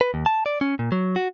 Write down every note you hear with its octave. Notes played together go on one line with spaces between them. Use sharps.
B4
D#2
A5
D5
C#4
A#2
F#3
F#4